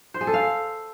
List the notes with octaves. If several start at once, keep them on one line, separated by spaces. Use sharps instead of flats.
C5
G#4
A4
F5